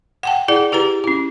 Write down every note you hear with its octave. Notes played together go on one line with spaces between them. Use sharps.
F#5 G5 A5
E4 G#4 D5 F#5
E4 G4 B4 A#5
C#4 E4